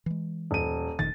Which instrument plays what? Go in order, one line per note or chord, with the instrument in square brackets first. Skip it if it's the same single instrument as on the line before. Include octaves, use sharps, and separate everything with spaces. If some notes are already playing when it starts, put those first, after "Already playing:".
[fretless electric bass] E3 G#3
[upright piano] D#1 D#7
[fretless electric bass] F1 A#2 D#3 [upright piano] A6